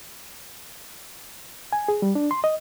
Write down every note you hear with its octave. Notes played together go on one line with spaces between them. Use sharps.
G#5
G#4
G3
D4
C6
D#5